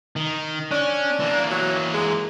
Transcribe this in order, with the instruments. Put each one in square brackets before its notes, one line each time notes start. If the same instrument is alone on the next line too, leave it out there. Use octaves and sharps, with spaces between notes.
[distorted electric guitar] D#3
[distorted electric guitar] C#4 [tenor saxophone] D4
[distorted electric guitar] E3 A#3
[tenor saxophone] F#3
G#3